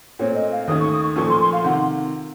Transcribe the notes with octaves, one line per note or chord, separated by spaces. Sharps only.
A#2 A3 C4 C#5
D#5
F5
D#2 D#3 A3 C#4 D#6
C#6
D#6
C#6
A#2 F3 A3 C#4 A4 C#6
C6
C6
F5
C3 D#3 F#5